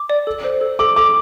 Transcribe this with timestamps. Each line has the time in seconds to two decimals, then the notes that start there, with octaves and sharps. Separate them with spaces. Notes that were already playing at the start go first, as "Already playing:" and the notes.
Already playing: D6
0.10 D5
0.27 A4
0.44 C5
0.61 A4
0.79 A4 D6
0.96 A4 D6